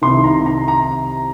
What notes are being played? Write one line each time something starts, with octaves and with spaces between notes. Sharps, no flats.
C2 C3 D#3 C6
A#5
A#5
A#5